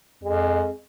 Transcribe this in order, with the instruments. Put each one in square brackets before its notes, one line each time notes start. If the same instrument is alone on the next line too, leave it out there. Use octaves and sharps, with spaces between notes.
[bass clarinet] F2 [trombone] G#3